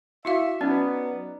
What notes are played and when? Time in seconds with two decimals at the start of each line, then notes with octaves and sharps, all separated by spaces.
0.25 E4 F#4 E5 F5
0.61 F#3 B3 C#4 D#4 D5